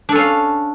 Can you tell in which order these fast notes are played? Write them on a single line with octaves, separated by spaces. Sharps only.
D4 A4 C#4 F5